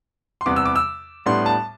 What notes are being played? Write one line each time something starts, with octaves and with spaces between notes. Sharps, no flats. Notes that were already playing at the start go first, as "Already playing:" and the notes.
C6
E2 C3 G3 B3 D6
E6
D6
E6
A2 G3 B3 D4 C6
A5